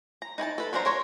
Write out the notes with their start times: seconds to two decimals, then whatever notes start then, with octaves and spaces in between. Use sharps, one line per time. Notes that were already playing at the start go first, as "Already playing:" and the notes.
0.22 A#5
0.38 D#4 E4 G#5 A5
0.58 A4 B4
0.73 F#3 D4 A#4 C5 A#5
0.85 A#4 C5 C#5